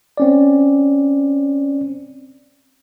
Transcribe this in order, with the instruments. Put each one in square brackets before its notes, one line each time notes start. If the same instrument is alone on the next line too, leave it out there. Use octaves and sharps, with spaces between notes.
[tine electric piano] C4 C#4 D5